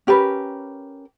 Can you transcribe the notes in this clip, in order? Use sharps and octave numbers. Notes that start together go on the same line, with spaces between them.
C#4 G4 A#4 B4